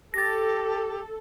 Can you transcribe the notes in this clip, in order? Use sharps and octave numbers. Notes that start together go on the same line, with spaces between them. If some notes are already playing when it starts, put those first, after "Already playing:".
G4 A4 A6 A#6